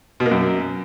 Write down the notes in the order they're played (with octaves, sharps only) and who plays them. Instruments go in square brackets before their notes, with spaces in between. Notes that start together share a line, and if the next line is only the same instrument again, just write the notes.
[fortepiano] B2
A#3
F#2